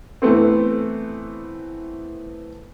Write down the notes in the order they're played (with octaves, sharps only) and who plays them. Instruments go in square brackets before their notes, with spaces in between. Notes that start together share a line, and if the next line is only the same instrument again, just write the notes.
[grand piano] E3 A3 B3 C4